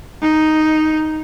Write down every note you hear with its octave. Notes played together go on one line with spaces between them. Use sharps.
D#4